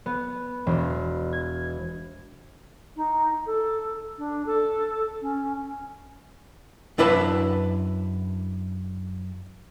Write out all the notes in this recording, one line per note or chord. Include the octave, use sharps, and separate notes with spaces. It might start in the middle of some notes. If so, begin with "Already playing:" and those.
B3
E1
G#6
D#4
A4
D4
A4
C#4
F#2 D4 E4 B4 A5